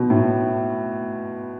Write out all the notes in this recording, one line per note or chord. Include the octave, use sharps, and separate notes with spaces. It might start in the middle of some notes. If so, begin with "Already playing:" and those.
Already playing: B2
A2